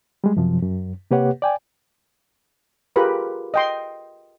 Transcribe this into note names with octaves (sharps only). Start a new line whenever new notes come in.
G3 G#3
F#2 C3 F3
F#2
C3 A#3 G4 B4 C#5 F#5
D5 G5 G#5
F4 G4 G#4 A#4 B4 B5
D#5 G5 C6